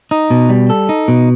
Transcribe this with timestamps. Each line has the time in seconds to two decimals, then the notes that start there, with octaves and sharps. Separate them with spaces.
0.11 D#4
0.30 B2
0.50 G3
0.70 A4
0.89 D#4
1.08 B2